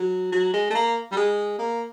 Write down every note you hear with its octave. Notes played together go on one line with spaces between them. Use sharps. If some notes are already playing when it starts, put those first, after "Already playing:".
Already playing: F#3
F#3
G#3
A3
A#3
G3
G#3
A#3